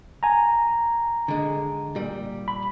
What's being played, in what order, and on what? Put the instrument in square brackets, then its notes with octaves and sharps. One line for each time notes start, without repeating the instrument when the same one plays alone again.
[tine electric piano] G#5 A#5
[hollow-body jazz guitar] D3 G#3
A#2 G3
[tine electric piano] B5